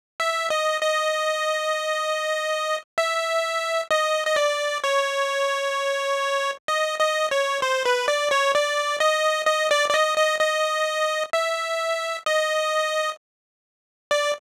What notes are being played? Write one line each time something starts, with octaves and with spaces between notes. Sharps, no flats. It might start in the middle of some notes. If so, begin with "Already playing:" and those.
E5
D#5
D#5
E5
D#5
D#5
D5
C#5
D#5
D#5
C#5
C5
B4
D5
C#5
D5
D#5
D#5
D5
D5
D#5
D#5
D#5
E5
D#5
D5